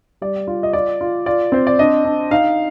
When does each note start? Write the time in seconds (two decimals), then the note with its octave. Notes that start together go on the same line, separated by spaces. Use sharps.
0.22 G3 D5
0.47 F4
0.63 D#5
0.73 F4 D5
1.01 F4
1.26 F4 D5
1.52 C4 C5
1.67 D5
1.79 D4 D#5
2.05 D4
2.31 D#4 F5